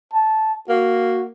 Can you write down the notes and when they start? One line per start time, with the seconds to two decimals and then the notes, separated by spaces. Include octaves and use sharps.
0.13 A5
0.69 A#3 F#4